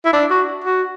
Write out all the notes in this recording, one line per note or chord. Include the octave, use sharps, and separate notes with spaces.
E4
D4
F#4
F#4